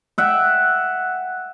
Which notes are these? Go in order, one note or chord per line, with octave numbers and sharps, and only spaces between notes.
E5 F#5 G5